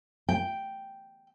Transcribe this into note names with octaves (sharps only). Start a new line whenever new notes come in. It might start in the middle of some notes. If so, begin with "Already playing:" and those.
G5